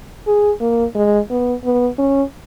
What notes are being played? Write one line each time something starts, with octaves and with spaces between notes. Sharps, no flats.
G#4
A#3
G#3
B3
B3
C#4